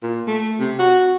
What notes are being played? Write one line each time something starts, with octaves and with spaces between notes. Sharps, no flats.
A#2
A3
C3
F#4